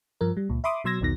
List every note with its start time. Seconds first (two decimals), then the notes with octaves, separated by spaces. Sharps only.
0.21 G2 F3 A#4
0.37 G3
0.49 C#2 A#2
0.64 E5 B5 C6 D6 D#6
0.84 B2 F#3 C6 E6 G#6 A#6
1.01 B1 E2 B2 D#3 A#6